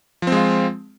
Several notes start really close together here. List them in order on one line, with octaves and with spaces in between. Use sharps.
F3 C4 G#3 F4